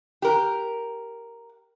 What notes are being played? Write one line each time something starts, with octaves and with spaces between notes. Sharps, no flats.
G4 A#4